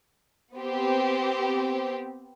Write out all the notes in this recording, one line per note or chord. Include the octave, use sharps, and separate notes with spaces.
B3 C4 G4